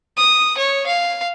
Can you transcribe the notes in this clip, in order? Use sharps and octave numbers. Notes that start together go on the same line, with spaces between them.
D#6
C#5
F5